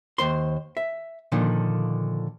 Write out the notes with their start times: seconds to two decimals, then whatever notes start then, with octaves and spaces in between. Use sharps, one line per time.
0.18 D#2 C5 C6
0.77 E5
1.32 A#2 D3 D#3 F3